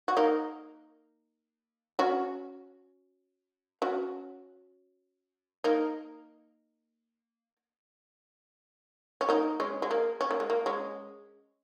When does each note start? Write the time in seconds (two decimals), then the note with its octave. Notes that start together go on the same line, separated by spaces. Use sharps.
0.08 F#4
0.17 A#3 D#4
1.99 C#4 F#4
3.82 C#4 F#4
5.64 A#3 D#4
9.21 C#4
9.29 A#3 D#4
9.60 G#3 C#4
9.82 G#3
9.91 A#3
10.21 C#4
10.31 A#3
10.40 G#3
10.50 A#3
10.66 G#3 C#4